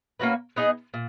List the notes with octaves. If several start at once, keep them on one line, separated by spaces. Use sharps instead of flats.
A#3 C#4 F#4 B4
B3 D#4 G#4 D#5
A#2